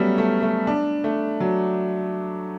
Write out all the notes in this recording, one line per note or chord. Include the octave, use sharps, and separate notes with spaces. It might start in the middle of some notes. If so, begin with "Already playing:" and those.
Already playing: F#3 G3 A3 B3 C#4
A3
A3
D4
A3
F#3